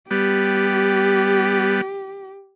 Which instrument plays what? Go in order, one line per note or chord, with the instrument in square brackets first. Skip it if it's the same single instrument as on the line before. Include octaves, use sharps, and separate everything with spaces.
[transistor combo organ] G3 B3 [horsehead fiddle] G4